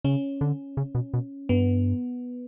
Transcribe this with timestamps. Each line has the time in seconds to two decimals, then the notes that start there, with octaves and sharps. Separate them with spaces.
0.04 C#3 C#4
0.41 D3
0.77 C#3
0.95 B2
1.14 B2
1.49 G2 B3